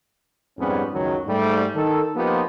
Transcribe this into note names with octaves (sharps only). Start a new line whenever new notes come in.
F2 G#2 G3 B3 C#4
C#2 F#2 D#3 F#3
G#2 G3 A3
D#3 A4
F3 A#3 B3 D#4 F4 G4